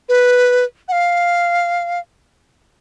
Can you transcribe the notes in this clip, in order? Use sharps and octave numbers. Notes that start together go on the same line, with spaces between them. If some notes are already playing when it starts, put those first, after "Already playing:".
B4
F#5
F5